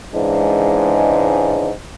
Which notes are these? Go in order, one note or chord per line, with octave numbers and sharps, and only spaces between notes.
G#2 C#3 E3 G#3 D4